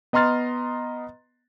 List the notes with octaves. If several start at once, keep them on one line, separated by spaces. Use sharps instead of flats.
B3 D#5 A#5 C6 F6 A6